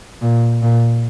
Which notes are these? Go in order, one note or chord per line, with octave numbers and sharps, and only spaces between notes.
A#2
A#2